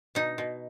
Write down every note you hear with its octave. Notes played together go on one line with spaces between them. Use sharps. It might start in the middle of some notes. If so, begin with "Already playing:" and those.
B2 D#4
B2